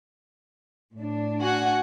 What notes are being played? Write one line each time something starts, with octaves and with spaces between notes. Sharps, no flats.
A2 D4
F#4 F#5 G#5